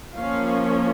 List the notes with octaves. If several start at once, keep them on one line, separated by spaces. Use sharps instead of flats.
F3 A#3 C#4 F5